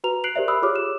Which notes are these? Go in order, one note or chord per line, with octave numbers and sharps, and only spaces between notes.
F#4 B4 A#5 F7
F#6 C7 D7 F7 F#7
G4 A#4 C5 D5 E5
B5 D#6 E6 F#6
F4 G4 G#4 C#5 D6 F6
E7